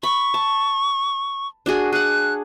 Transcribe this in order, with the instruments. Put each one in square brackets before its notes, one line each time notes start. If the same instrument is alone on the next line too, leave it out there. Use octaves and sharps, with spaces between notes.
[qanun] B5 [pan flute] C#6
[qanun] A5
D4 F#4 G#4
[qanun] G#4 F#5 [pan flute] F#6